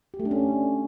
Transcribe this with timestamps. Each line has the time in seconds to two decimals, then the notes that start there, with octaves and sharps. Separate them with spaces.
0.14 G4
0.20 A3
0.25 D4
0.31 C#4